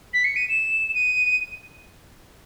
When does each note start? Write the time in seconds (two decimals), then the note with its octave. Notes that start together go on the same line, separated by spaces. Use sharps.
0.13 B6
0.24 C#7
0.36 D#7
0.48 E7
0.94 D#7